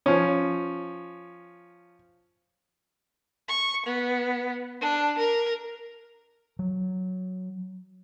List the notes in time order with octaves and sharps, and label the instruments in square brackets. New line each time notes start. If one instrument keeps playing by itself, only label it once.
[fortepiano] F3 C#4
[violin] C#6
B3
D4
A#4
[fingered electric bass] F#3